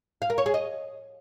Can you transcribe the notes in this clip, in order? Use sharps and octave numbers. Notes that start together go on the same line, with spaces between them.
F5
A#4
C#5
G#4
D#5